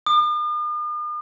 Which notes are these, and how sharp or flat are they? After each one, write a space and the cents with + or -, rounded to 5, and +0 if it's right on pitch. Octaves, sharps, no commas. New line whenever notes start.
D#6 -45